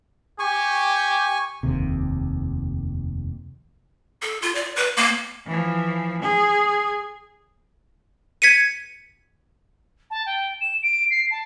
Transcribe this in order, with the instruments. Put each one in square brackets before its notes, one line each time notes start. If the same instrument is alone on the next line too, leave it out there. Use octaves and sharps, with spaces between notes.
[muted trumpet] G4 [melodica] G#5 C#6
[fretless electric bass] F1 D#2 C3
[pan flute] A4
F4
D5
B4
A#3
[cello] E3 F3
G#4
[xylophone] G#6 B6 C#7 D#7
[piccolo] A5
G5
E7
D7
C7
A5